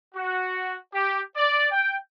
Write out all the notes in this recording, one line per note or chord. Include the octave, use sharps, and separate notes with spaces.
F#4
G4
D5
G5